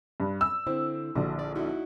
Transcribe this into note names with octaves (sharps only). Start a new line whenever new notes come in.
G2
E6
D3 C4 E4
A#1 D3 F#4
D5
D#4 E4 F#4